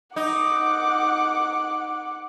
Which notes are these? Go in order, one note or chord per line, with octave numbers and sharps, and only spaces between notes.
D#4 F#5 D6